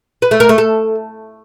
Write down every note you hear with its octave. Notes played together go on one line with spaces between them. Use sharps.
B4
A3
A#4
A3
A4